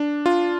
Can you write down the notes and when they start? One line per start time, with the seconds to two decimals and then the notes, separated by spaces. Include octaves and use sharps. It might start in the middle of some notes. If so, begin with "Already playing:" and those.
Already playing: D4
0.26 F4